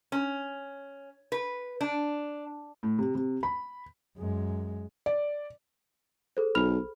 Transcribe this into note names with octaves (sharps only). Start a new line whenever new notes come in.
C#4
B4
D4
A2
C3
C3
B5
F#2 G#3
D5
G#4 A4 C5
B1 B5 F6 F7